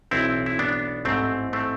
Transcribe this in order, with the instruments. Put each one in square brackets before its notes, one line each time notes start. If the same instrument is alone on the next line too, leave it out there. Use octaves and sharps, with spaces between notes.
[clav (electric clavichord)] B1 A2 E3 C4 E4
E4
B3 D4
A1 G#2 E3 A3 C4
A3 C4